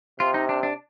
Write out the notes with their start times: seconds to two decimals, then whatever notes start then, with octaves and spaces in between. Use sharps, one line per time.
0.20 C3 F4
0.34 D#4
0.49 D4
0.63 D4